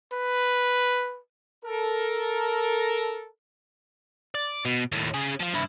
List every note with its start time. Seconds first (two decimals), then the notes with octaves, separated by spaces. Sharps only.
0.13 B4
1.64 A4 A#4
4.35 D5
4.65 B2
4.92 D#2 A2
5.14 C#3 G#4
5.40 F3 F4
5.53 G2 E4